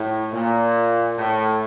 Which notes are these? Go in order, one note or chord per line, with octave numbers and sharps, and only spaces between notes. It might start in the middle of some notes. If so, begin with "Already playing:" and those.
Already playing: A2
A#2
A2